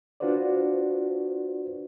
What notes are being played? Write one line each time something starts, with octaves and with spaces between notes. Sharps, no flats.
D4 F4 F#4 B4 C5 D5